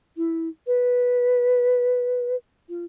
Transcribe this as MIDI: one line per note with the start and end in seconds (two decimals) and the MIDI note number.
0.16 0.48 64
0.67 2.36 71
2.69 2.84 65